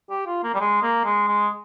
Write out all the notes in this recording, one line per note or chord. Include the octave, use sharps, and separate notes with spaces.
G4
F4
A#3
G3
G#3
A#3
G#3
G#3